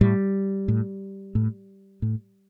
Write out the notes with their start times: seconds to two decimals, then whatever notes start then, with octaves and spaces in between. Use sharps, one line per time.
0.01 A2 G3
0.68 A2
1.35 A2
2.02 A2